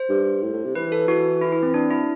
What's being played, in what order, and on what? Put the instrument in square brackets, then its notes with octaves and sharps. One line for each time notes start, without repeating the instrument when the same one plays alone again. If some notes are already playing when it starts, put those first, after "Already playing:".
Already playing: [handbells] C5
[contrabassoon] G2
A2
A2
C3
[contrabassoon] E3 [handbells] B4
[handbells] A4
[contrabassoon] E3 [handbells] F#4
[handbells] E4
E4
C4
D4
E4